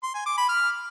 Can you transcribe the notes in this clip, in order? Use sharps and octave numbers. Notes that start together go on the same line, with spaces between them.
C6
G#5
D6
B5
F6